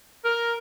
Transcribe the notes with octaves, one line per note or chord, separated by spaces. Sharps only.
A#4